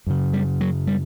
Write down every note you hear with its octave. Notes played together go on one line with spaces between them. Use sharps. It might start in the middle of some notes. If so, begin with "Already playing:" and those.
F#2 C#3
G3
F#3
G3